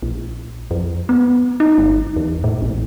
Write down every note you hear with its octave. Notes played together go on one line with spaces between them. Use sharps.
A#1
F2
B3
D#4
G1
E2
A2
A1